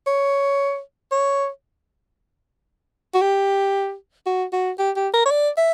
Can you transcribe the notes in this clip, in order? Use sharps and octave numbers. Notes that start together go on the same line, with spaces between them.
C#5
C#5
F#4
G4
F#4
F#4
G4
G4
A#4
C#5
D5
E5